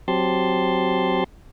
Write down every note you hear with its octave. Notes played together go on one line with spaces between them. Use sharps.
F#3 C4 G4 A5 C6